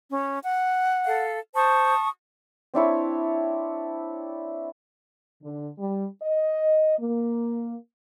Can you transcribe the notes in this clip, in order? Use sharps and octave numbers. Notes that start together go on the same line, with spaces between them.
C#4
F#5
A4 F5
C5 A5 C#6 D#6
C4 D4 E4 C#5
D3
G3
D#5
A#3